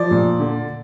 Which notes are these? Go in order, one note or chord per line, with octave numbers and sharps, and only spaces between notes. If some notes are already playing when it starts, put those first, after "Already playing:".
Already playing: F3 D5
A#2
D3